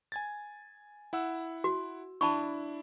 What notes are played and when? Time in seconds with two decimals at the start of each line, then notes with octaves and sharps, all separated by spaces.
0.12 G#5 G#6 A6
1.13 E4 F#5 E6
1.64 F#4
2.21 D4 E4 A5 B5 C#6